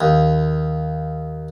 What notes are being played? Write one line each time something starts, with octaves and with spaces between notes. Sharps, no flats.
D#2